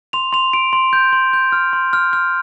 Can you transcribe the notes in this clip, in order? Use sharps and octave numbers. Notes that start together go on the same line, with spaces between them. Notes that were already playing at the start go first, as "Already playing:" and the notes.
C6 F7
C6 F7
C6 D7
C6
G6
C6
G6
F6
C6
F6
F6